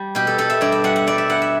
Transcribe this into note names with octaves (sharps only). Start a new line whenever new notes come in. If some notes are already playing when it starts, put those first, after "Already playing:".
Already playing: G3
B2 G4
A4
B2 A4
E5
G2 D5
E5
G3 F#5
F#5
G3 D5
E5
G2 F#5
E5